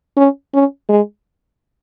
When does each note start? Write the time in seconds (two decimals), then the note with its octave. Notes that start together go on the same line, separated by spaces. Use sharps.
0.17 C#4
0.54 C#4
0.89 G#3